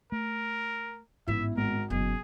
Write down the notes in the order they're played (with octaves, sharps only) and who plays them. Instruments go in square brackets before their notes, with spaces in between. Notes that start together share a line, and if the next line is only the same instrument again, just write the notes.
[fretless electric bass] A3 [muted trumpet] A#4
[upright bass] A1 B3 [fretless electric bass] G#2 G#3 [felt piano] E4 [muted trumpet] E5
[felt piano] G#1 [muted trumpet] A#4
[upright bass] F#1 F#2 [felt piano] B2 [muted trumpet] G#4